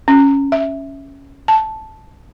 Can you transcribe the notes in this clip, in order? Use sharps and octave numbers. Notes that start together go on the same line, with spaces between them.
C#4
E5
A5